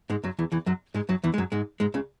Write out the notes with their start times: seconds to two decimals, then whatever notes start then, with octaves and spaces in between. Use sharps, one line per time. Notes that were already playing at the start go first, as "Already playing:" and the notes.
0.10 G#2 G#3
0.24 F#2 F#3
0.39 E2 E3
0.52 E2 E3
0.66 F#2 F#3
0.94 G#2 G#3
1.09 F#2 F#3
1.24 E2 E3
1.34 G#3
1.38 F#2 F#3
1.52 G#2 G#3
1.80 G#2 G#3
1.94 C#2 C#3